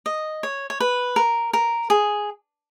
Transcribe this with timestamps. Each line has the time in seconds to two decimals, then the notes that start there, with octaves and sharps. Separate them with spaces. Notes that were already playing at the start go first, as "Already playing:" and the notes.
0.06 D#5
0.43 C#5
0.70 C#5
0.80 B4
1.16 A#4
1.53 A#4
1.90 G#4